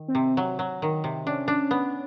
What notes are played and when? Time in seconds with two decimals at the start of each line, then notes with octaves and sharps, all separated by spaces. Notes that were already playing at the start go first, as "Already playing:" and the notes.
Already playing: D#3
0.08 C4
0.15 C3
0.37 F#3
0.59 F#3
0.82 D#3
1.04 C3
1.26 C#4 D4
1.48 D4
1.71 B3